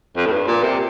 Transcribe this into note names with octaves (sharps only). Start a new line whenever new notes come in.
F2
A2
G2
A#2
C3